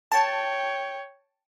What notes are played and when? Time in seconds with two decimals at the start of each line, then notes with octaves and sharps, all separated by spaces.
0.12 C#5 G5 A5